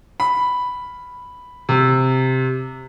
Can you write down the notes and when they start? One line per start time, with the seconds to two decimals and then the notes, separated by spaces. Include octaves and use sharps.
0.20 B5
1.69 C3